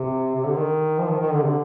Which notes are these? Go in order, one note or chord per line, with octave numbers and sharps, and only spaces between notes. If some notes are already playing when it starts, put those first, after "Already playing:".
Already playing: C3
C3
D3
D#3
F3
D#3
D#3
D3
C3
D3